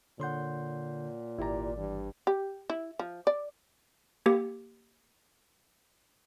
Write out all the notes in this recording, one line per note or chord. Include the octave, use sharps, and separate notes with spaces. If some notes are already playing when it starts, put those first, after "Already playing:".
A#2 D3 C#5 F#5 C6 G6
G#1 E4 G4 D5 A#5
G2 E3
G4
E4
F3
D5
A#3 G4